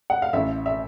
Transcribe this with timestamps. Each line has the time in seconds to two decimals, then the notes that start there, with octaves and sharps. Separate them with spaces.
0.10 F#5
0.22 F5
0.33 A1 E5
0.66 E5